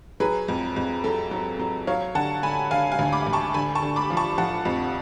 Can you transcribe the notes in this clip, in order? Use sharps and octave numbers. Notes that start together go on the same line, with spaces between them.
F#3 G#4 B4
F2
F2
F#3 A4
F#3
F#3
F#3 C#5 F5
D3 F#5 A5
D3 G#5 B5
D3 F5 G#5
F5 G#5
D2
B5 D6
D2
A5 C#6
D3 G#5 B5
A5 C#6
D3
B5 D6
F3
A5 C#6
F3 F#5 A5
F2